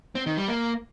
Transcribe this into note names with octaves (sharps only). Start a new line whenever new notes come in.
C4
D#3
G3
A#3